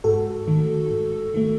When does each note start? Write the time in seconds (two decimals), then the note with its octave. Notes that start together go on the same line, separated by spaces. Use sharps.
0.04 G#2 F#4 A4
0.47 D#3 A3
0.91 G#2
1.34 D#3 A3